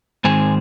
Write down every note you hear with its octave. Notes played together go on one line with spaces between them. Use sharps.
G#2 D#3 G#3 C4 G#5